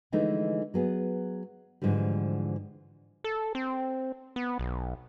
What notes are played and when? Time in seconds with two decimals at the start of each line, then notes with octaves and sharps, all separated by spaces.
0.12 D3 E3 F3 G#3 A3 D#4
0.74 F#3 B3 G#4
1.82 G#2 D3 E3 F3 G3
3.24 A4
3.55 C4
4.36 B3
4.59 B1